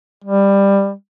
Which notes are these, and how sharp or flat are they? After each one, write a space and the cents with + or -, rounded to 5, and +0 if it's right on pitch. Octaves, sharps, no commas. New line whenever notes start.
G3 +15